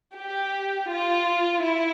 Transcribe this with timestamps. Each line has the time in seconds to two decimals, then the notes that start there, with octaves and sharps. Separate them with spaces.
0.15 G4
0.88 F4
1.62 E4